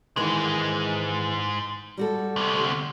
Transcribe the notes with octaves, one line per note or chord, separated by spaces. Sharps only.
G#2 D#3 E3 G#3
G3 F#4 A4
D2 C3